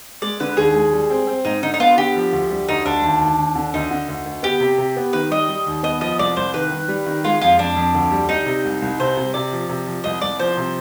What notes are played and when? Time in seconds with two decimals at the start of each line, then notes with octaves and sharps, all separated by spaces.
0.22 G#3 D5
0.40 D3 B4
0.57 D#2 G#4
0.75 G#3
0.93 G3
1.10 C4
1.27 C4
1.45 G#2 D#4
1.63 D3 D#4
1.74 D#4
1.80 B3 F4
1.97 D3 G4
2.16 F3
2.32 D2
2.51 G3
2.69 D2 D#4
2.85 D2 D4
3.03 D#2
3.21 D#2
3.38 D#2
3.55 D3
3.74 D2 D#4
3.91 D3
4.08 D2
4.26 D2
4.43 B3 G4
4.60 C3
4.78 C3
4.96 B3
5.13 D#3 B4
5.31 G3 D#5
5.49 G3
5.66 D#2
5.83 B3 D#5
6.01 F3 D#5
6.19 C2 D5
6.36 C2 C5
6.54 D#3 B4
6.71 D#3
6.88 G3
7.06 D#3
7.24 G#3 F4
7.41 F2 F4
7.59 F2 D4
7.76 F2
7.95 D2
8.12 G3
8.29 G3 D#4
8.46 C3
8.65 C2
8.82 C2
9.00 C3 C5
9.17 C3
9.34 C3 D5
9.52 F3
9.69 C3
9.87 F3
10.04 C2 D#5
10.21 C2 D5
10.39 F3 C5
10.57 C3